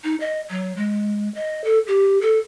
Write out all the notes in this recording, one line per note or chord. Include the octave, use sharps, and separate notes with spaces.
D#4
D#5
F#3
G#3
D#5
A4
G4
A4